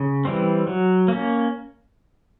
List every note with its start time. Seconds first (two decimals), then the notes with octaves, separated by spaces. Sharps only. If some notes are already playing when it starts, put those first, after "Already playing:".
Already playing: C#3
0.25 E3 G3 C4
0.67 F#3
1.08 A#3 C#4